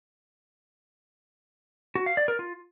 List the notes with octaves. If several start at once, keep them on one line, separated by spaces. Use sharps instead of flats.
F#4
F5
D5
A#4
F4